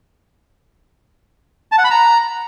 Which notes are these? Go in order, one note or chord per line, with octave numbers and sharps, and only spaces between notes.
A5
F#5
B5
A#5